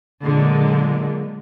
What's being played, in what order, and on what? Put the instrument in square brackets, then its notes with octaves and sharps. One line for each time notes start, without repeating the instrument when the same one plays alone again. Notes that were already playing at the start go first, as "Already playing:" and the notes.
[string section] A#2 D3 F#3 G#3 A#3